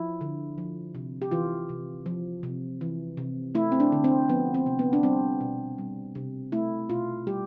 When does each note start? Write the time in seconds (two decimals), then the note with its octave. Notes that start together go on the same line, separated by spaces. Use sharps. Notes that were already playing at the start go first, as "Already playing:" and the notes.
Already playing: F3 E4
0.21 D3
0.58 F3
0.95 C3
1.22 G4
1.31 E3 F4
1.69 C3
2.06 F3
2.43 C3
2.81 E3
3.17 C3
3.55 A3 E4
3.72 C4
3.80 D4
3.92 D3
4.04 C4
4.29 F3 B3
4.54 C4
4.66 C3
4.79 B3
4.93 D4
5.03 G3 C4
5.40 B2
5.78 G3
6.15 C3
6.52 A3 E4
6.90 B2 F4
7.27 G3 G4